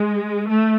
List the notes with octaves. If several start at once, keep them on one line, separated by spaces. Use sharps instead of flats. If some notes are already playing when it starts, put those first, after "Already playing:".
Already playing: G#3
A3